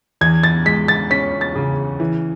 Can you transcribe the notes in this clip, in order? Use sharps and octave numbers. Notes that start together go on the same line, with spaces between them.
E2 G#6
A6
G#3 B6
A6
C#4 B6
A6
C#3
E3